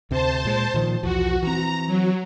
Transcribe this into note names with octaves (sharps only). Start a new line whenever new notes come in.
D2 C3 C5 A5
A#2 G#3
A#2 D#3 F3
B1 E2 F3 F#4
E3 C4 A#5
F#3